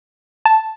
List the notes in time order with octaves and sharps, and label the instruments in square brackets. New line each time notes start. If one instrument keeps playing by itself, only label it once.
[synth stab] A5